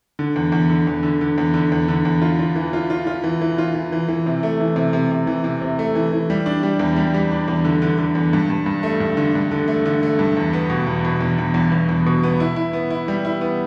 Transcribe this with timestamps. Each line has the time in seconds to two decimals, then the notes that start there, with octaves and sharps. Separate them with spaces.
0.19 D3
0.36 E2
0.52 E2
0.70 D3
0.87 E2
1.03 D3
1.21 D3
1.38 E2
1.54 D3
1.72 E2
1.88 D3
2.05 E2
2.22 F4
2.39 F4
2.56 E3
2.73 F4
2.90 F4
3.07 F4
3.24 E3
3.41 E3
3.58 F4
3.74 E3
3.92 E3
4.08 E3
4.26 C3
4.43 A3
4.60 E3
4.76 C3
4.93 C3
5.11 C3
5.27 E3
5.44 C3
5.62 C3
5.79 A3
5.95 E3
6.12 E3
6.30 G3
6.46 D4
6.63 G3
6.79 E2
6.96 G3
7.14 G3
7.32 D4
7.48 E2
7.65 D3
7.82 D3
7.98 D3
8.15 E2
8.33 G2
8.50 G2
8.66 G2
8.83 A3
9.00 G2
9.17 D3
9.35 G2
9.51 D3
9.68 A3
9.86 D3
10.03 A3
10.19 G2
10.37 E2
10.53 B3
10.70 B2
10.87 E2
11.05 B2
11.21 E2
11.39 E2
11.54 E2
11.72 E2
11.89 E2
12.06 B2
12.23 B3
12.40 E4
12.56 E4
12.73 B3
12.91 E4
13.08 G3
13.25 E4
13.41 B3